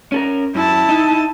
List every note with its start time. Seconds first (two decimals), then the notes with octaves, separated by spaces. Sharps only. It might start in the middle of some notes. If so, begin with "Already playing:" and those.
0.12 C#4 A4 A#4
0.55 F#2 E4 A5
0.89 D#4